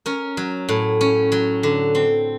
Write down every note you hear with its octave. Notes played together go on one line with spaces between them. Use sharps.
C#4 A#4
F#3
A2
C#4
F#3
D3
C4